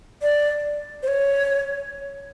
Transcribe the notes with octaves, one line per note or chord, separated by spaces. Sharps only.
D5
C5
C#5